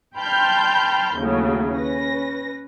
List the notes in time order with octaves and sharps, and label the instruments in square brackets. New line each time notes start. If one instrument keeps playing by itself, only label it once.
[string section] G5 A5 B5 C6 F6 G6
D#2 A2 C#3 F#3 A3
C#4 B4 A#6